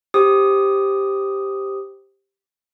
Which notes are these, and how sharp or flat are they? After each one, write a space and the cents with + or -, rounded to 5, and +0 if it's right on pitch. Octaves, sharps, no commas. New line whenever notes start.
G4 +0 C5 +0 D#6 +0